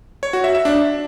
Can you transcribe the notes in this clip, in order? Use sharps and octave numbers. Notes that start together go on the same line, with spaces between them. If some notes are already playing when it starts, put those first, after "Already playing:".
C#5
F#4
E5
E5
D4